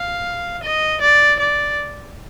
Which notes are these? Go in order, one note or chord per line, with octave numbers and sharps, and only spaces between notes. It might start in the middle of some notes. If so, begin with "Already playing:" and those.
Already playing: F5
D#5
D5
D5